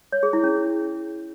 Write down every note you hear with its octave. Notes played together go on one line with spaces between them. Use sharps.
C#5
G#4
E4
C#4